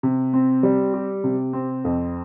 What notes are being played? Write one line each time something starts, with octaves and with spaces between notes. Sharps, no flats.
C3
C4
G3
G4
C3
C4
F2